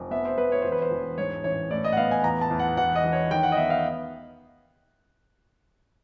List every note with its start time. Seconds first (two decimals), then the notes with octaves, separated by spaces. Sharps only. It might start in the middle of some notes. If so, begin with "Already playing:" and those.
Already playing: F1
0.11 B3 E5
0.25 C5
0.37 B3 B4
0.52 C#5
0.62 E1 C5
0.72 B4
0.82 C5
0.91 E1
1.18 G#2 C#5
1.44 A1 C#5
1.71 A2 D5
1.84 D#5
1.92 F#5
1.97 B3 F5
2.11 G#5
2.24 E2 A#5
2.41 A5
2.51 E2
2.59 F#5
2.77 E1 F#5
2.95 D#5
3.04 E3
3.13 C#5
3.31 D#3 G5
3.43 F#5
3.52 D#5
3.57 B3 E5
3.70 F5